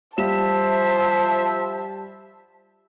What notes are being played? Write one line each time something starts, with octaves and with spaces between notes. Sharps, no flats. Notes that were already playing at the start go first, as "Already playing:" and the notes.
F3 G3 C5 E5 A5 E7